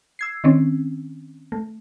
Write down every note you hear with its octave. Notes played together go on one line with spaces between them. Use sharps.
E6 G#6 C7
D#3 C4 C#4
A3